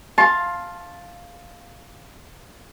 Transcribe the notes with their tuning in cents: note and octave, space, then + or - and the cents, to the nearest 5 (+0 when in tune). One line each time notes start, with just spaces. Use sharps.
F5 +0 A5 +0 C6 +20